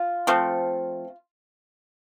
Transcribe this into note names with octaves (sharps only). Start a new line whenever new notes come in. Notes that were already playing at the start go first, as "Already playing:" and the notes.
Already playing: F4
F3 A3 C4